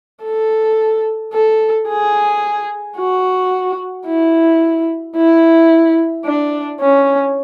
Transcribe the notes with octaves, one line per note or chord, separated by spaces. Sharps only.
A4
A4
G#4
F#4
E4
E4
D4
C#4